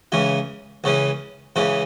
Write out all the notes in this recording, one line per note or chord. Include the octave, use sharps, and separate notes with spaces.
C#2 C#3 E3
C#2 C#3 E3
C#2 C#3 E3